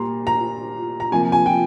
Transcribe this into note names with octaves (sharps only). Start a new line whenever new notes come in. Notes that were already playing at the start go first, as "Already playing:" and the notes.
Already playing: A#2 G3 A#3 A#5 C6
A#5
A#5
C3 F3 A#3 G#5
G#5
G5